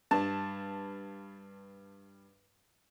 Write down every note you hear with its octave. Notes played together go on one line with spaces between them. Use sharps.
G2 A5